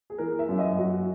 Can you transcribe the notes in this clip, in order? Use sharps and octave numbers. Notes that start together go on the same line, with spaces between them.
G#4
E3 A#4
E5
F#2
D#5
F#2 F#4